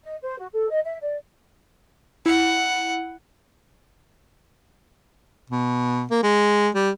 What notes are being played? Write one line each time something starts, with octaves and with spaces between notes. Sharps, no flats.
D#5
C5
F#4
A4
D#5
E5
D5
E4 F#5
B2
A#3
G#3
G3